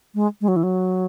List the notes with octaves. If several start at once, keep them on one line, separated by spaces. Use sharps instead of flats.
G#3
G#3
F#3
E3
F#3